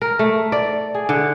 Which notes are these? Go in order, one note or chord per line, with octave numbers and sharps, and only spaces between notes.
A#4
A3
D5
G#4
D3